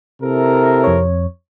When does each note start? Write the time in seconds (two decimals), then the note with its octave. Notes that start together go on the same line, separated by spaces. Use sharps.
0.22 C3 E4 A4 A#4
0.84 F2 C#5